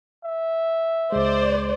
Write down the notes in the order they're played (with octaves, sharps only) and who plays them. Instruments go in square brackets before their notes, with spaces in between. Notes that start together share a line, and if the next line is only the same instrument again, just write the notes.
[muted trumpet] E5
[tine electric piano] C#2 G#3 [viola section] C5 D5